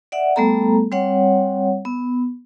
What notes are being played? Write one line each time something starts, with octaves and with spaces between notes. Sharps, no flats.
D5 E5 F#5
G3 A3 B3 A4 A#5
G3 C4 C#5 F#5
B3